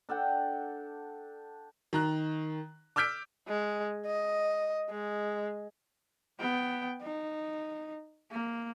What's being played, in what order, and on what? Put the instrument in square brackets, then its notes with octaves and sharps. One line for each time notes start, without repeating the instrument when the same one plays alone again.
[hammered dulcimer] D4 A4 F#5 G5
[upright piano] D#3 A#5 F#6
D6 E6 F6 G6 B6 D7
[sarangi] G#3
D#5
G#3
[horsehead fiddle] B3 G5
D#4
A#3